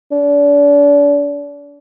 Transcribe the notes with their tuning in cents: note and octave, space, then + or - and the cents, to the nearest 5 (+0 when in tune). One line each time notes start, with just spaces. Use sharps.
D4 -35